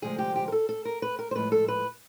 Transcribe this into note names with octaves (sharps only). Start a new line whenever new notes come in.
D2 C3 F3 G#3 G#4
G4
G4
A#4
A4
A4
A#4
B4
A#4
C5
A2 F3 G#3 B4
A4
B4